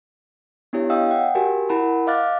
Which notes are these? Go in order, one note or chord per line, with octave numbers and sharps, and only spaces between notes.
B3 D4 E4 G4 C#5
C#5 D#5 F5 G5 D#6 E6
F#5 G5
F#4 G4 A#4 G#5
E4 A#4 F#5 A5 B5
D#5 F5 D6 F6 F#6 A6